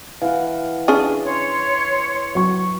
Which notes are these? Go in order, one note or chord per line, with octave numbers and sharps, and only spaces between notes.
E3 F5 F#5
C#4 D4 G#4
C#5 C6
F#3 C#6